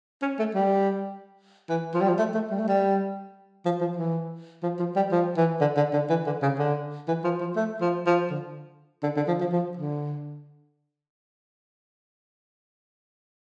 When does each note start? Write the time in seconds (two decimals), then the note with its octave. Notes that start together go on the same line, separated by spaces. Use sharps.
0.22 C#4
0.39 A3
0.55 G3
1.69 E3
1.94 F3
2.01 G3
2.09 F3
2.19 A3
2.34 A3
2.50 G3
2.59 A3
2.68 G3
3.65 F3
3.81 F3
3.97 E3
4.63 F3
4.79 F3
4.96 G3
5.12 F3
5.37 E3
5.61 D3
5.77 D3
5.93 D3
6.10 E3
6.26 D3
6.42 C#3
6.59 D3
7.08 E3
7.24 F3
7.40 F3
7.56 A3
7.81 F3
8.06 F3
8.30 D3
9.03 D3
9.16 D3
9.28 F3
9.41 F3
9.52 F3
9.77 D3